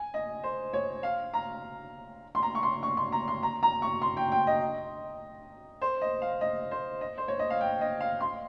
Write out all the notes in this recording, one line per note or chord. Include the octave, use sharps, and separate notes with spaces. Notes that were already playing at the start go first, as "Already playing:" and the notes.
Already playing: G#5
D#5
C5
C#5
F5
A#5
C6
A#5
C#6
C6
C#6
C6
A#5
C6
A#5
A#5
C#6
C6
G5
G5
D#5
C5
D#5
F5
D#5
C5
D#5
C5
C#5
D#5
F5
G5
D#5
F5
C6